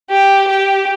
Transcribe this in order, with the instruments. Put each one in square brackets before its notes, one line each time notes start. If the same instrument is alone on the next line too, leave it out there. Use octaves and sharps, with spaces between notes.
[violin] G4
G4